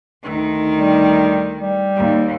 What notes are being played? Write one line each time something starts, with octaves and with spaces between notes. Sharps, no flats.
D2 D#3
G3
G3
D#2